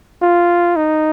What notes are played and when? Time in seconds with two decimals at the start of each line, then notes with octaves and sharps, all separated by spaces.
0.22 F4
0.76 D#4